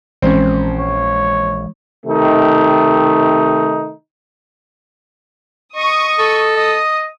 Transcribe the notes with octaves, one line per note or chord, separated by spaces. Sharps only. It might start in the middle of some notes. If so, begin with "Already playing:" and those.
A#1 E3 G#3 C4 C#4
C#5
C3 D#3 A3 D#4
D#5 C#6 D#6
A4
D#5 D#6